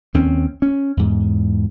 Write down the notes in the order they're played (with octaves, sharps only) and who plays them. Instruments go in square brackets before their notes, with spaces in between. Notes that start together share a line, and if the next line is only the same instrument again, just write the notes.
[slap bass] D#2 C4 C#4
C#4
E2 G#2